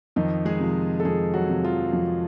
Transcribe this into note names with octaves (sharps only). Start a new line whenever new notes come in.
F2 D#3 D#4
G#3 G#4
C3 F3
A4
F2 G#3 G#4
F#3 F#4
C3 F3
F3 F4
F2